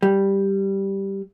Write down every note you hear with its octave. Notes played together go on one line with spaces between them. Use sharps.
G3